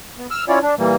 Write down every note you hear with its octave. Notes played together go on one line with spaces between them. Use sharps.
B3
E6 F6
C#4 E4 F4 C#5 D5
D4
A#2 E3 G3 A#3